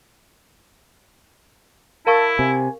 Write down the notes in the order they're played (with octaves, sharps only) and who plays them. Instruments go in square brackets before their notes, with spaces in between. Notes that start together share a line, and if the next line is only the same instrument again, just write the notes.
[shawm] E4 [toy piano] A#4 F5 C#6 [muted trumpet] A5
[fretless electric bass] C3 [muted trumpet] G#5